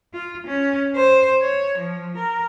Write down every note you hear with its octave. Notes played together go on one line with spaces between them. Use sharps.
F4
C#4
C5
C#5
F3
A#4